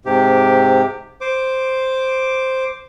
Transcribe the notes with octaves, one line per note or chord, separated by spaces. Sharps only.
G#2 C3 G4
C5 D6